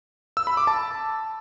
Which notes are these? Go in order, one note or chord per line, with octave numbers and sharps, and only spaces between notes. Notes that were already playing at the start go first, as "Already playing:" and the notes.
E6
B5
D6
A5